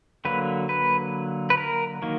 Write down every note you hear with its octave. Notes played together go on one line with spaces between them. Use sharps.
D3 F#3 A#3 B4
B4
B4
A#4
D#3 F#3 A#3